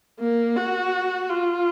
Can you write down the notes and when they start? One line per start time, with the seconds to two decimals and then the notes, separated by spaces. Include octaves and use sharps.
0.20 A#3
0.56 F#4
1.29 F4